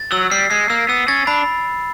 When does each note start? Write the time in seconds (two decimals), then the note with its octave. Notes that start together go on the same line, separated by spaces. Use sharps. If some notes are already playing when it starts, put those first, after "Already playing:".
Already playing: A6
0.12 F#3 E6
0.31 G3 C7
0.51 G#3 C7
0.70 A#3 E6
0.89 B3 E6
1.08 C#4 A6
1.27 D4 B5